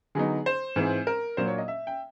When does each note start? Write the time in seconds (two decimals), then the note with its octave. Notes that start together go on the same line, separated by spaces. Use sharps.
0.15 D3 F#3 B3 D#4 G#4
0.46 C5
0.76 G#2 E3 G#3 C4
1.07 A#4
1.37 A#2 F#3 A#3 D4 C5
1.48 C#5
1.58 D#5
1.68 E5
1.87 G5